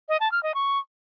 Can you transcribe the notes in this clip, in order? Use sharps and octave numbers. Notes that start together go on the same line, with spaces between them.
D#5
A5
F6
D#5
C#6